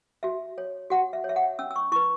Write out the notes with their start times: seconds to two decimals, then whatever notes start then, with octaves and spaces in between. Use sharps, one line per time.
0.23 F#4 E5
0.58 C#5
0.90 F#4 F#5
1.13 E5
1.24 C#5
1.29 E5
1.36 F#5
1.59 C#4 E6
1.71 E6
1.76 C#6
1.92 E4 B4 C#6